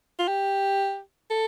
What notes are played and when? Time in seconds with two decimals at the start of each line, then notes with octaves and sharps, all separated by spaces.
0.19 F4
0.28 G4
1.31 A4